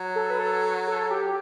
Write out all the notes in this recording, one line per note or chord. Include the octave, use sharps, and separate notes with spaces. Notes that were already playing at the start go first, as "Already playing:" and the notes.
Already playing: F#3
A4
B4
A4
A4
G4